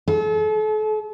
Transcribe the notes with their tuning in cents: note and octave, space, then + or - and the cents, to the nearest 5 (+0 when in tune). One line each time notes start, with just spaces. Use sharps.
A4 -40